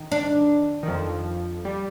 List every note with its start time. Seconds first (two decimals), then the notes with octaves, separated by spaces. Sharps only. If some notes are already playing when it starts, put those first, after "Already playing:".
Already playing: D#3
0.12 D4
0.83 D#3
0.88 F2 F3
1.65 G3